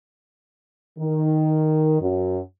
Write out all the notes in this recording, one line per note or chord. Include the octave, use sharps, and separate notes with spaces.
D#3
F#2